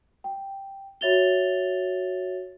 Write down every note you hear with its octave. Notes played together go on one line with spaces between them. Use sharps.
G5
F#4 C#5 E5 A6 F7 G7